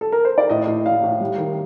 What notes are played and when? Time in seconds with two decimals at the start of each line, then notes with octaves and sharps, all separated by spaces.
0.01 A4
0.12 A#4
0.25 C5
0.38 D5
0.49 A2 D#5
0.67 A2
0.86 A2 F5
1.03 A2
1.21 G3
1.38 D#3